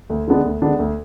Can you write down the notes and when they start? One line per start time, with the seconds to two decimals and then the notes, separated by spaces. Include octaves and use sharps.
0.10 D2
0.27 D3 G#3 B3 D4
0.45 D2
0.62 D3 G#3 B3 D4
0.79 D2